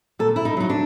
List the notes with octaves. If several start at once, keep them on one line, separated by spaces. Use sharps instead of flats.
A#2 A4
E4
D#4
F#3 D#4
D4